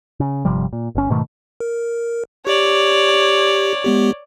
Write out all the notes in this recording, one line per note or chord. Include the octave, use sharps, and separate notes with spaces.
C#3
G1 C3 F3 G3
A#2
G1 C#4
G#2 B2 D#3 A3
A#4
G4 C#5 D5
G#3 B3 G4